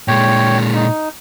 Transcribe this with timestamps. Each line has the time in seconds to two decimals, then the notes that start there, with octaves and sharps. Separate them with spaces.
0.08 A#2 G#3 C#5 G5
0.74 D#4